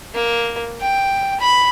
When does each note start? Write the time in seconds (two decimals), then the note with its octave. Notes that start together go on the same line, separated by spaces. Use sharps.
0.15 A#3
0.80 G5
1.40 B5